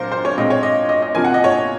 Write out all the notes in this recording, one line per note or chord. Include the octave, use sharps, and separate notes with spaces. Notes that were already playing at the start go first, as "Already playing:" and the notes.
Already playing: A#2 F#3 C4 A#4 C5
C5
C#5
A#2 G#3 C4 D#5
C#5
D#5
D#5
D#5
C3 F3 A#3 G#5
F#5
D#5
C#5